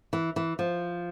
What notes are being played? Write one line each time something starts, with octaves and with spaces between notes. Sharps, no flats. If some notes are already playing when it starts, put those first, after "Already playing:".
E3
E3
F3